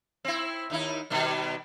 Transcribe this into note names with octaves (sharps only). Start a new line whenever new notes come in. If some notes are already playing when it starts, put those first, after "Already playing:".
C4 E4
D#2 D#4 E4
B2 D#3 G3